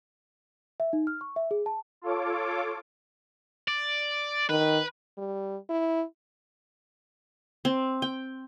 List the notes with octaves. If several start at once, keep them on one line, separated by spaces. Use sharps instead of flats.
E5
D#4
F6
C#6
E5
G#4
A5
F4 A4 C#5 D6
D5
D#3 B4
G3
E4
C4
G5